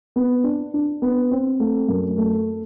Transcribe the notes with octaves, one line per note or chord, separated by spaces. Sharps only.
B3
D4
D4
B3
C4
A3
F#2
A3